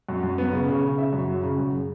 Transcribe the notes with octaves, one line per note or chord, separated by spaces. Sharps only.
F#2
F#2
B3
C#3
C#3
C#3
C#3 E5
F#2
F#3
C#3
F#2